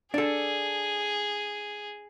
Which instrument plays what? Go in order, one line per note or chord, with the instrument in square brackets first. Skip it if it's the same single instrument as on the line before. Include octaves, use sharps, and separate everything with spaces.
[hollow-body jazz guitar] D4 A4 [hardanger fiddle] G#4